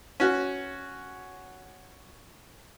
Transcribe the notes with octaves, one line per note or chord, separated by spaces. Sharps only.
C#4 F#4